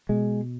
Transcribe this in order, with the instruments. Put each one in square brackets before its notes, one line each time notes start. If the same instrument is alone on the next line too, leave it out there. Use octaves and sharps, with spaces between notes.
[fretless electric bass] B2 G#3